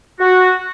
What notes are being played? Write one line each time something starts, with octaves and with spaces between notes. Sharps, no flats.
F#4